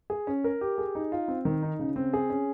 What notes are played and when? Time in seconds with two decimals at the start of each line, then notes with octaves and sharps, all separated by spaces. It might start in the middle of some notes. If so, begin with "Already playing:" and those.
0.10 G#4
0.27 C#4
0.44 A#4
0.61 G4
0.78 G#4
0.95 D#4
1.12 F4
1.28 C4
1.45 D#3
1.62 D#4
1.79 C#3
1.96 C4
2.13 G#4
2.30 C#4